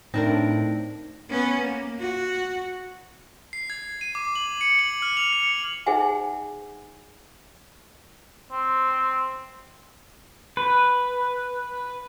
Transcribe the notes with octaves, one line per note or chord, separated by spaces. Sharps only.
A2 C4 D4 D#4 A#4 A#6
B3 C#4
A#3
F#4
C7
G#6
D#7
D6
F#7
C#7
F#7
F6
F7
C#7
D#4 G#4 C5 E5 F#5 G#5
C4
B4